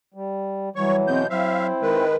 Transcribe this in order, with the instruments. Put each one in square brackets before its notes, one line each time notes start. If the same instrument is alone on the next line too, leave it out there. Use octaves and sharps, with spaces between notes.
[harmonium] G3
[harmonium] E3 F#3 [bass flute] G3 [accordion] C#5 C#6
[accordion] B2 G#3 G6 [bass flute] C4
[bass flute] F#3 [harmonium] C4 E4 C5 [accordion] E5 F5
[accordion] D#3 G#3 B4 [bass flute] A#4